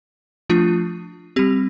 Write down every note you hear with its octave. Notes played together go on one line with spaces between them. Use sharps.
F3 A3 D4 F4
G3 C4 G4